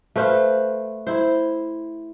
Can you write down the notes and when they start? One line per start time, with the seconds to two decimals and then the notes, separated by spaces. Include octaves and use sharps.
0.16 A3 B4 C5 F5
1.07 E4 C5